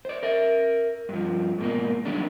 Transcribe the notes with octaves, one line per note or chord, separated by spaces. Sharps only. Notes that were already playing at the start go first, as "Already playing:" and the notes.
C5 D5
A#4 E5
G2 F3
G#2 B2 A#3
D#3 F#3 G3 C#4 D4